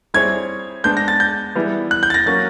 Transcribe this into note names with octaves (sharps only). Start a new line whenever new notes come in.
G3 C4 E4 G#4 C#5 G#6
G#3 B3 D4 G6
A#6
A6
G6
E3 G3 B3 E4 G#4
F#6
G6
A6
A#6
F#3 A#3 C#4 F#4 A#4 A6